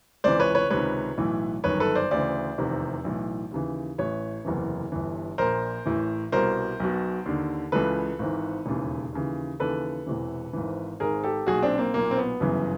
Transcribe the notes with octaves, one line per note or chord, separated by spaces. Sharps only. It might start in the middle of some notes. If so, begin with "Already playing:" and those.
C#2 C3 E3 C5 D5
B4 C#5
B4 C#5
C#2 C3 D#3 B4 C#5
B1 A2 E3
G1 F#2 D#3 B4 C#5
A4 B4
C5 D5
D2 C#3 E3 C5 D5
F1 E2 C3 D#3
B1 A2 E3
D#2 C#3 E3
A1 A2 E3 B4 C#5
F#1 E2 C3 E3
G1 G2 E3
A#1 A#2 A#4 C5
A1 A2 E3
C2 B2 A#4 C5
B1 B2
D#2 D3
C#2 C#3 E3 A4 B4
G#1 G#2 E3
E1 D#2 C#3 E3
D#2 C#3 E3
D#2 C#3 E3 A4 B4
E1 E2 C3 E3
G#1 G#2 E3
G#1 G#2 D#3 G#4 A#4
G4 A4
B1 A#2 F#4 G#4
C4 D4
A#3 C4
B1 A#2 A#3
C4
B3
G1 F#2 C#3 E3